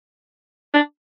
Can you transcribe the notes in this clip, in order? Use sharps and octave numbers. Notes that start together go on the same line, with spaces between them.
D4